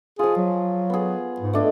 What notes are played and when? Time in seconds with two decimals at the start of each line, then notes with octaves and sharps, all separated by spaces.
0.19 F3 F4 G#4
0.37 F#3
0.90 B3 G#4
1.40 G#2
1.53 A3 D4 D#5